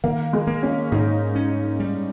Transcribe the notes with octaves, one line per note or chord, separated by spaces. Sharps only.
D#3 A#3
G#3
A#3
C#4
G#2 D#4
C#4
G3